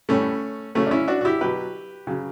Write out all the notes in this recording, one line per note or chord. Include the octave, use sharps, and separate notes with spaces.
A2 G3 A3 C#4
C#3 F#3 A3 C#4
D4
C#4 E4
D4 F#4
F#4
E4 G4
B2 F#3 G4 B4
C#3 F#3